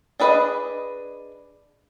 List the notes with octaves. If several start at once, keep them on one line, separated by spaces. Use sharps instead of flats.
D4 G#4 B4 D5 D#5